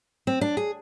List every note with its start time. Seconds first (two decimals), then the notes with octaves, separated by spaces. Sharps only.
0.27 C4
0.41 D4
0.57 G#4